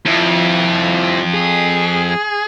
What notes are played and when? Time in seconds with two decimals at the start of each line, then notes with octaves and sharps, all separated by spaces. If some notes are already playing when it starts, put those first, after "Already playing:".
0.06 F2 F3 E4
1.34 G#4